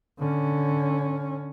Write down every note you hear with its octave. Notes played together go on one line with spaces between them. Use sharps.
D3 C#4